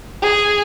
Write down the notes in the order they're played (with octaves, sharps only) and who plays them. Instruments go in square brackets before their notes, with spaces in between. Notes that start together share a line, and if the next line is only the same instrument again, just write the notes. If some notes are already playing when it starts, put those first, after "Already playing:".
[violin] G#4